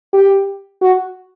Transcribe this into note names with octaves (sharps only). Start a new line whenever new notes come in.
G4
F#4